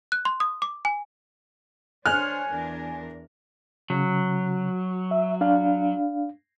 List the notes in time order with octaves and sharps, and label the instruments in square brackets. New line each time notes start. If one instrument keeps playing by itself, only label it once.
[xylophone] F#6
C6
D#6
D6
G#5
[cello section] D4 C5 C#5 [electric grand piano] G#5 [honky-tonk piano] F6 F#6
[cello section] E2 D4 A#4
[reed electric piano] C#3 [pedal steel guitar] F#3
[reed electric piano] E5
D4 F5